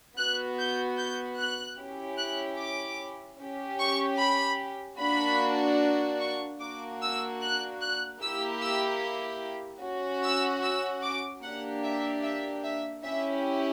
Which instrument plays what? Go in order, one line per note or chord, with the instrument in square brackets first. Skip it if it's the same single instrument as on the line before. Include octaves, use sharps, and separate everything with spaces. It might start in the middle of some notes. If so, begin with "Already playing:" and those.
[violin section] B3 F#4 F#6
G6
G6
F#6
C#4 E4 G4
F#6
D6
C#4 G4
C#6
B5
A#3 D4 F#4 B5
C#6
A#3 D4 F#4 D6
E6
F#6
F#6
A#3 E4 G4 E6
E6
C#4 F#4
E6
E6
D6
A#3 D4 G4 F#5
E5
E5
E5
C#4 E4 G4 E5